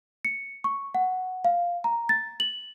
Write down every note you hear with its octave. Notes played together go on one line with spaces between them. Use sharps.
C#7
C#6
F#5
F5
A#5
A6
F#7